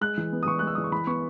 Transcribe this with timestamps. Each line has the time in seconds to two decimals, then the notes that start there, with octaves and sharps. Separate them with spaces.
0.01 G#3 F#6
0.17 E3
0.33 B3
0.43 D#6
0.46 E3 C#6
0.59 G#3 F#6
0.67 E6
0.75 E3 D#6
0.84 C#6
0.92 E3 B5
1.07 B3 C#6